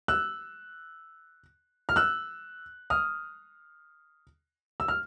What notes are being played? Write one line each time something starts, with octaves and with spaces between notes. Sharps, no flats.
E6 F#6
F6
E6 F#6
D#6 F6
E6
F6